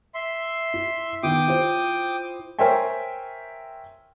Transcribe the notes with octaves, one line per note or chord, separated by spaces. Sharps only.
E5 C6
E4
D#3 B3 E4 G5 D6 D#6
E4 F4 C5
A#4 C5 C#5 E5 G5 G#5